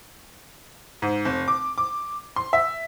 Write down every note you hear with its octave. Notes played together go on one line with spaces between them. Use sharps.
G#2
F1
D6
D6
C6
E5